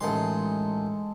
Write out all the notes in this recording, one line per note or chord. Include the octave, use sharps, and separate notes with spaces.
A1 D#3 G#3 A4 C6